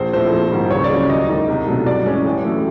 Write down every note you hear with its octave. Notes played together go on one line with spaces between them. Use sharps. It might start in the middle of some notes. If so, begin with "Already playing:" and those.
Already playing: A#1 C5
A2 F3 A3 C4 C5
A#1
G#2 D#3 G3
C#2 C#5
D5
C#3 F#3
D#2 D#5
D#3 G#3
C2
B2 F#3 A3 D4
G2 D5
E3 G#3 C#4
A1
A2 F#3 A3